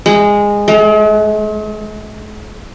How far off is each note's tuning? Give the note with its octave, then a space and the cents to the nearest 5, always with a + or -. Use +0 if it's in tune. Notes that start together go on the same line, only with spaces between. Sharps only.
G#3 -15
G#3 +45